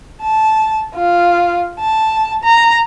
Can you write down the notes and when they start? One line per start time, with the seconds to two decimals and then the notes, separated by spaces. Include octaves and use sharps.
0.22 A5
0.95 F4
1.80 A5
2.44 A#5